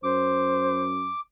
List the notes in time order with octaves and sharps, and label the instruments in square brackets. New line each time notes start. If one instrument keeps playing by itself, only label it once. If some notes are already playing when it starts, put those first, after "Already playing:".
[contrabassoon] F#2 [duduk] C5 [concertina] D6